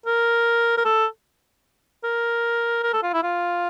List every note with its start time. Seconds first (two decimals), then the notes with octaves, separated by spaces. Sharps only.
0.06 A#4
0.77 A#4
0.85 A4
2.04 A#4
2.83 A#4
2.93 A4
3.03 F4
3.13 E4
3.23 F4